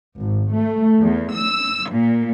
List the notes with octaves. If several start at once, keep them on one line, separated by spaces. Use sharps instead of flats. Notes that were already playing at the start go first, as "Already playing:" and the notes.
G#1
A3
E2
E6
A#2